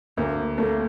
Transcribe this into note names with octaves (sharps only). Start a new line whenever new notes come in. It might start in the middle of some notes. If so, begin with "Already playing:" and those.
D2 A#3
A3 A#3